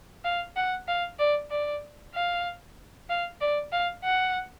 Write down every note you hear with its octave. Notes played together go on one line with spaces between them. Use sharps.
F5
F#5
F5
D5
D5
F5
F5
D5
F5
F#5